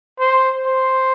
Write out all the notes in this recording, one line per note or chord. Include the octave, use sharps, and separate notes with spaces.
C5
C5